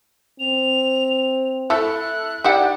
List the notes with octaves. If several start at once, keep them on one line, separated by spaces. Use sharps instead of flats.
C4 F7
A3 E4 A4 F#6
D#4 E4 G4 D5 F#5